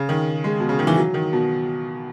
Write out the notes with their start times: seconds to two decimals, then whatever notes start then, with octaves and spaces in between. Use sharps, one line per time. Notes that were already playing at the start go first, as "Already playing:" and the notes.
Already playing: C#3
0.09 D#3
0.44 G#3
0.60 B2
0.69 C#3
0.79 D#3
0.87 E3
0.98 F#3
1.14 D#3
1.33 B2